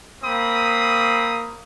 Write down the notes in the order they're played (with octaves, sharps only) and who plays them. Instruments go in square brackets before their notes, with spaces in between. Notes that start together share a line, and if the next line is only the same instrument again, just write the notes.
[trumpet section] A#3 C4 B5 D#6